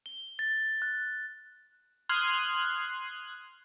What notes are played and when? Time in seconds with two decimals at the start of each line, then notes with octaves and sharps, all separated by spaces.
0.06 G7
0.39 A6
0.82 F#6
2.09 C6 D#6 F6 F#6 G#6